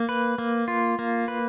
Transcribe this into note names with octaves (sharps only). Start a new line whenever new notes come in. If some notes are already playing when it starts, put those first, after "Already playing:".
Already playing: A#3
B4
A#3
F4
A#3
B4